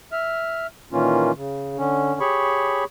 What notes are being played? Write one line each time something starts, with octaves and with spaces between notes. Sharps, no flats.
E5 F6
A#2 D#3 E3 A#3 C#4 F4
C#3
D3 C#4
G4 G#4 C#5 B5 C#6